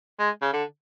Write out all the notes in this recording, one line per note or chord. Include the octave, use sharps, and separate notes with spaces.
G#3
C#3
D3